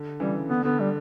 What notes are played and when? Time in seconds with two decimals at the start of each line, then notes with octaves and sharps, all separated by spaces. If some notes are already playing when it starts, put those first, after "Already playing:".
Already playing: D3
0.20 C#3 E3 G3
0.49 D3 B3
0.64 D3 B3
0.80 G3